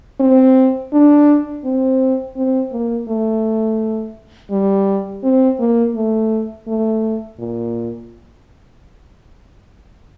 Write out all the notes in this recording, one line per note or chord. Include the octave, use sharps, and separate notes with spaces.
C4
D4
C4
C4
A#3
A3
G3
C4
A#3
A3
A3
A#2